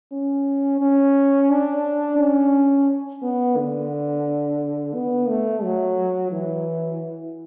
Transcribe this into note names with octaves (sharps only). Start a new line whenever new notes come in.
C#4
C#4
D4
C#4
B3
D3
B3
A3
F#3
E3